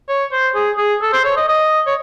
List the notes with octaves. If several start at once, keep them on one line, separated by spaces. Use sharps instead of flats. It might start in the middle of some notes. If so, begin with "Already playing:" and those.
C#5
C5
G#4
G#4
A4
C5
C#5
D#5
D#5
C#5